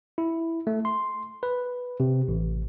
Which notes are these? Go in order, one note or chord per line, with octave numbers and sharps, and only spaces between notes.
E4
A3
C6
B4
C3
A1